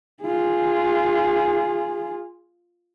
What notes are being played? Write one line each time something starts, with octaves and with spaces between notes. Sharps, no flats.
F4 G#4